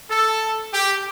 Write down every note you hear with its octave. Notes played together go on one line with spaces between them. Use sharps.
A4
G4